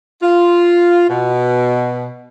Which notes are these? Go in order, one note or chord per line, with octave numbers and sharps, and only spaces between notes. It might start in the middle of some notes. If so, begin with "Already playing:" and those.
F4
B2